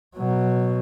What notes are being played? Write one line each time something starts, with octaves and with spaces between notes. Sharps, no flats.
B2 F#3